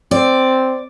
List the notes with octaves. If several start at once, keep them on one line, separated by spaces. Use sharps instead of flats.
C4 D5